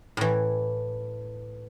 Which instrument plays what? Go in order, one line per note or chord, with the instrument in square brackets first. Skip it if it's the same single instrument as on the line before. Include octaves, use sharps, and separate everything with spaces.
[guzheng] A2 E3